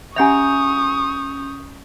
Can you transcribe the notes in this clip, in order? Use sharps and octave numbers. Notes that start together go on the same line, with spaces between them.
C#4 E5 F#5 G#5 C#6 D#6 G6 F7